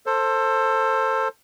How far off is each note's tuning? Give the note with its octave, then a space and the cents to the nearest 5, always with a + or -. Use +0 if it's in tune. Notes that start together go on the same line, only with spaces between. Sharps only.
A4 +20 C5 +20